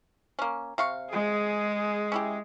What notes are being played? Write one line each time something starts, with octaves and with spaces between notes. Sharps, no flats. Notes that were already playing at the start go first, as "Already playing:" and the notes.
A#3 C#4
C3 F5 C#6
G#3 G#4
C#4 E4 G4